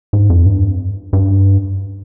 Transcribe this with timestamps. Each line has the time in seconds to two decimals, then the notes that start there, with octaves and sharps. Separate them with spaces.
0.13 G#2
0.30 F2
0.46 G2
1.13 G2